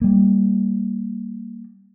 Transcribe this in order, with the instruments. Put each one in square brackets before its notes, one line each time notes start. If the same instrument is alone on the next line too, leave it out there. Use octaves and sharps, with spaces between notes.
[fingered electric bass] G3 A#3